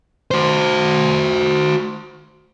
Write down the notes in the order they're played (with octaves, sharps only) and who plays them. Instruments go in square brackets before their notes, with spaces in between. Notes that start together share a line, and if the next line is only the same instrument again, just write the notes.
[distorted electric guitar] F#4 C5